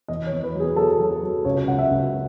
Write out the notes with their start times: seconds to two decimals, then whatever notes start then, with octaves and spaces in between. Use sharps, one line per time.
0.08 E2 D#5
0.26 C#5
0.32 E2
0.44 B4
0.55 F#3
0.60 G#4
0.76 F#3 A4
1.00 F#3
1.11 A4
1.23 F#3
1.45 C#2 C#5
1.68 C#2 F#5
1.79 E5
1.91 C#2